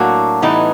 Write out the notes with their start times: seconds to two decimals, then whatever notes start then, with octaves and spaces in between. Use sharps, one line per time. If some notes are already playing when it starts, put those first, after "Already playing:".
Already playing: A2 F#3 A#3 D4 F#4
0.42 A2 E3 G3 B3 D#4